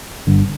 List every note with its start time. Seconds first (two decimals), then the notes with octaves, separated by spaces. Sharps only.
0.27 G1 G2 D3